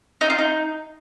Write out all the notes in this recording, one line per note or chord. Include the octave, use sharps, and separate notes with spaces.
D#4
F4
D#4